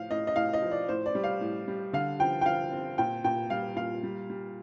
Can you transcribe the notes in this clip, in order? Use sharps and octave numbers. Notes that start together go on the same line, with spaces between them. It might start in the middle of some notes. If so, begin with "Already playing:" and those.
Already playing: A2 F3 F5
A2 D#5
D#5
A2 F5
D#5
F3
D5
A2 C5
D5
G3
F5
A2
G3
D3 F5
F3 G5
G5
F3 F5
C4
A#2 G5
A#2 G5
G3 F5
A#2 F5
G3
G3